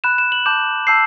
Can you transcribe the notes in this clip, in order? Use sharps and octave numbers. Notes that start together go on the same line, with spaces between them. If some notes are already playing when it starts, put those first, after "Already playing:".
B5 F#6 E7
E7
F#7
A5 D6 G6 E7
A5 E6 G6 C7